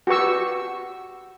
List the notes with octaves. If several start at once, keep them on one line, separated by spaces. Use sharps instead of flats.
F#4 G4 B4 C#6 E6